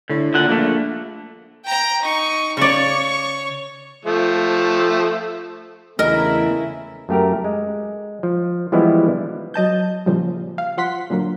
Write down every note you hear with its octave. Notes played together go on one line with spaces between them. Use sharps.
A2 D3
A#2 D3 F#5
A#1 A3 A#3
G5 A#5
D#4 C#6
C#3 C#5 D5 C#6
F3 A3 F4
E2 C#3 A3 E4 A#4 D#5
F#2 A3 G4 A#4
G#3
F3
E3 F3 G3 G#3 B3 E4
F#3 D#5 A5 G6
A#2 C#3 F3 G3
F5
F3 F#5 C6 B6
A#2 D3 F#3 A#3